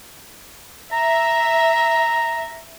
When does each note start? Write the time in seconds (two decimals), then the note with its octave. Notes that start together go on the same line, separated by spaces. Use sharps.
0.92 E5 A#5